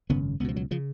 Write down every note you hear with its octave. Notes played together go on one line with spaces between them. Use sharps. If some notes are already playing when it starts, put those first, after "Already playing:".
G#1 F#2 C#3 B3
C#2 B2 F3 B3
F#3
C#3 F3